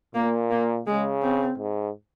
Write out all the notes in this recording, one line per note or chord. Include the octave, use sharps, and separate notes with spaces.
A#2 A#3
A#3
C#3 G#3
C4
G#2